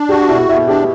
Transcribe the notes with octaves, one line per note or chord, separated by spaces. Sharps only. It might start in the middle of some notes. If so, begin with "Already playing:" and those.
Already playing: D4
F#4 G4
B2 E4 E5
B2 E4 E5
D4 G4